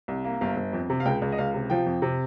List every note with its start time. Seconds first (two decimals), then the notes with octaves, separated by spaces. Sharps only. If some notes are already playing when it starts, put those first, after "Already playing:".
0.08 C2
0.24 A#3
0.41 G1 F5
0.57 G1
0.73 F2
0.90 C3
1.00 F5
1.05 C#2 G5
1.22 C#2
1.32 D#5
1.38 C#2 F5
1.54 C3
1.70 F3 G5
1.86 F2
2.02 C3